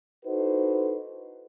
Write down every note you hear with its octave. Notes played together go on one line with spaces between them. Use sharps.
D#4 E4 F#4 A4 B4 C5